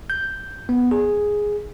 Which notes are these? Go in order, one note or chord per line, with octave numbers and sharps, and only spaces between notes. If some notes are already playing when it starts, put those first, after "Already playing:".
G6
B3
G#4